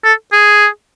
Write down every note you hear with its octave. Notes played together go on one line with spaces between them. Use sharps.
A4
G#4